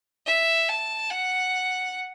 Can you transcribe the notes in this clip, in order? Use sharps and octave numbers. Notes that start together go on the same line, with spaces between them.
E5
A5
F#5